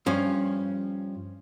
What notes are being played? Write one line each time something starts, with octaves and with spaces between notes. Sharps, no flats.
G2 F3 C#4